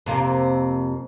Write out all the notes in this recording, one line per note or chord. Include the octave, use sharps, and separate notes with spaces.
F2 C3 A#3